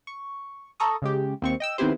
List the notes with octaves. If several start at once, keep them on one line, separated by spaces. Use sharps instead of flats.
C#6
A4 A#5 C#6 D#6
C#3 G#3 G4
D#2 C4 C#6
D#5 G5 E6
D#3 B3 C4 E4 G4 C5